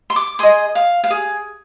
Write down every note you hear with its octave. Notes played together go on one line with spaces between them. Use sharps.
C6
D6
G#4 D#5 C6
F5
F5
G#4